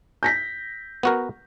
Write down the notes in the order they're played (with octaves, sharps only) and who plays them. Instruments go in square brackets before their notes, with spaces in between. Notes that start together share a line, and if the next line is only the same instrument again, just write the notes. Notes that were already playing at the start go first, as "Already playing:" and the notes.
[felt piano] G6 A#6 B6
[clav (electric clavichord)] B3 F#4 A#4